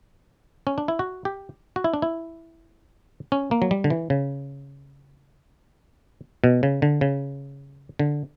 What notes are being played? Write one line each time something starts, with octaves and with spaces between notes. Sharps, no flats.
C#4
D4
E4
F#4
G4
F#4
E4
D4
E4
C#4
A#3
F#3
G3
D3
E3
C#3
B2
C#3
D3
C#3
D3